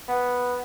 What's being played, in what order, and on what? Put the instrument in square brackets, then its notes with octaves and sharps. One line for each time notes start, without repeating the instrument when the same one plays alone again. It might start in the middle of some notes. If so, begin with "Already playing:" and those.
[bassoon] B3